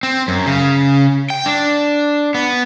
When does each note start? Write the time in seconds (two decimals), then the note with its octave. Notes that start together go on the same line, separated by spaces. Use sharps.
0.03 C4
0.28 F#2
0.46 C#3
1.30 G5
1.46 D4
2.35 B3